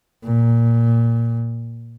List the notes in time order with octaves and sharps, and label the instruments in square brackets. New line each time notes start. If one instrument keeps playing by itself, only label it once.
[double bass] A#2